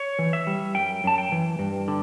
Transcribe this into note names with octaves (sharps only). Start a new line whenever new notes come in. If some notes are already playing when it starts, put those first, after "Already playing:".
Already playing: C#5
E3
E5
G3
F#2 G5
F#2 A5
G5
E3
G2
D3